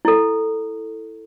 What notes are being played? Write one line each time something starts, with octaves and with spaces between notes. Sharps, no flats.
E4 A4